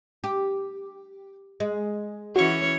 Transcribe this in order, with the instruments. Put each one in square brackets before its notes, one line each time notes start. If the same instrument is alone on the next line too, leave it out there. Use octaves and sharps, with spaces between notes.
[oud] G4
G#3
[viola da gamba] E3 C#4 C#5 [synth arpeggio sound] F#4 C#6